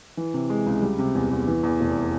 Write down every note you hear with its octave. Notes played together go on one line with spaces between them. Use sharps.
E3
C3
G#3
C#2
G3
C3
E2
E2
E3
E2
F1